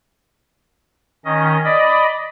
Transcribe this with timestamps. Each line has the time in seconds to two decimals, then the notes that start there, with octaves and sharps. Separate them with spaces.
1.25 D#3 C#4 D#5
1.65 D5 D#5 B5